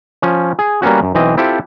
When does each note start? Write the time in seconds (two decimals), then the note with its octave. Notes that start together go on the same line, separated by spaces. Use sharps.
0.22 F3 C#4
0.59 G#4
0.82 G3 A#3 B3 C#4 F#4
1.03 F#2
1.15 B1 E3 C4 D#5
1.37 C4 E4 F4 G4 A4